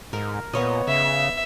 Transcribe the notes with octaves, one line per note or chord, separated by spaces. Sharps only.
G#2 A#4
A#2 B3 C#5 D#5
C#3 E5